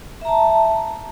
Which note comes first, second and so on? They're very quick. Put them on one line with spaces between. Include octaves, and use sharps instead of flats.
E5 A#5 A5